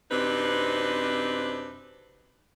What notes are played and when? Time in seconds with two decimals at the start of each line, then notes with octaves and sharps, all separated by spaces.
0.11 F#2 C3 C4 D4 D#4 B4